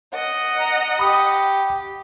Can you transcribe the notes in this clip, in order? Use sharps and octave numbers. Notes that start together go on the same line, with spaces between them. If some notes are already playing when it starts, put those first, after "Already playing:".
D#5 F#5
A#5
G4 B5 D#6